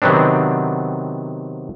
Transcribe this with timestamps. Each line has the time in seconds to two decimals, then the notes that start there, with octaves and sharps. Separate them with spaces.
0.02 C3 D#3 F#3 B3 C4 D4